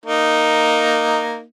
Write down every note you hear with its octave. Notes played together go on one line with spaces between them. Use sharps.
A#3 D#4